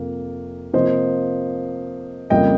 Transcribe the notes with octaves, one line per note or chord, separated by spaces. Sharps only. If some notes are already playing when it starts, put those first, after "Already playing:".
Already playing: F2 C3 A#3
C3 F3 A#3 C5 D#5
F2 C#3 G3 A#3 D#5 G5